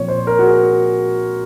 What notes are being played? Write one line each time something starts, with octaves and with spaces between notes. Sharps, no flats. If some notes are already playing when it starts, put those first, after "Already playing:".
Already playing: A#2 F3 C4 C#5
C5
A#4
F#4
G#4